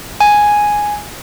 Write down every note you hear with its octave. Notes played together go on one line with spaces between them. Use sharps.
G#5